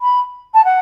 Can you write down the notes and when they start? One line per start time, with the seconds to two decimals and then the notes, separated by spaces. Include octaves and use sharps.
0.01 B5
0.54 A5
0.65 F#5